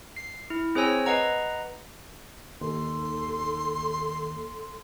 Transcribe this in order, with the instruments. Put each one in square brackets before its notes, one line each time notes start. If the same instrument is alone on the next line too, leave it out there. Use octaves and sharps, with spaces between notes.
[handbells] C7
E4
C4 G#4 C5 C#5 G#5 E6
B4 D#5 F#5 A#5
[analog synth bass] D#2 [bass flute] A4 [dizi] C6